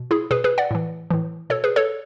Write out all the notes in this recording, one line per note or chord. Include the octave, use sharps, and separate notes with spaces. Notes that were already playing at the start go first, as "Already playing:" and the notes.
Already playing: B2
E4 G#4
B2 G#4 B4
G#4 B4
D5 F#5
A2 E3
A2 E3
B2 A4 C#5
G#4 B4
A4 C#5